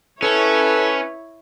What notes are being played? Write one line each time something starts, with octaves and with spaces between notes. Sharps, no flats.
C#4 E4 A4 B4 C#5